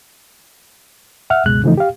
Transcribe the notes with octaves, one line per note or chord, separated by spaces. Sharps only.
E5 F#5 F6
C#2 F#2 B2 G#3 F#6
C#3 E3 F3 A3 D#4
G4 F5